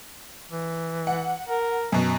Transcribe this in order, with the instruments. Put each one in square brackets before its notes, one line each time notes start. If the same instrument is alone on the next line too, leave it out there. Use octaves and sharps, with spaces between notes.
[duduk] E3
[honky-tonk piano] F#5
[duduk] A#4
[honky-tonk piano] F#2 B2